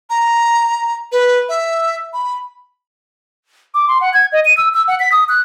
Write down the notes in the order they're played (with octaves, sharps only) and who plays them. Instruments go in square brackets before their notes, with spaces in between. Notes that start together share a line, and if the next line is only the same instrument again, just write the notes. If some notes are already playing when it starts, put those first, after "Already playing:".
[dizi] A#5
B4
E5
B5
[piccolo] D6
C6
F#5
G#6
D#5
D#7
E6
E6
F#5
B6
D#6
F#6